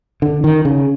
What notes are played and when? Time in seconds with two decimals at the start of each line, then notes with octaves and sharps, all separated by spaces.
0.22 D3
0.44 D#3
0.65 C#3